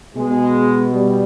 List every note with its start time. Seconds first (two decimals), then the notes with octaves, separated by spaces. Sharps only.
0.16 B2 G#3
0.92 G3